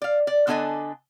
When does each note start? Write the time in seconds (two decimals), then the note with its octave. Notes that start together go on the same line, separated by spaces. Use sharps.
0.02 D5 F5
0.27 D5
0.47 D3 B3 D4 A4 D#5 G#5